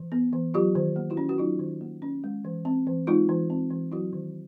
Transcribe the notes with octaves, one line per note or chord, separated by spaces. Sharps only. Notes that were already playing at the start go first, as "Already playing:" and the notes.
Already playing: E3
B3
E3
F#3 F4 G4
D#3
A#3
E4 F#4
C#4
F#4
F#3 D#4 F4
D#3
A#3
C#4
G#3
E3
C4
E3
G#3 D#4 F4
E3
C4
E3
F#3 E4 F#4
D#3